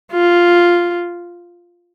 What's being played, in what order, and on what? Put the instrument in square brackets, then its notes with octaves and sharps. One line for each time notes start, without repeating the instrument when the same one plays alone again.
[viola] F4